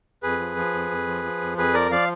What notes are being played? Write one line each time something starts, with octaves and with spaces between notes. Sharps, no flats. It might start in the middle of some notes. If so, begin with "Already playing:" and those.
F2 G#4 B4
F3
F3
F2
F2
F3
F3
F2
F2 G#4 B4
F3 A#4 D5
F3 D5 F5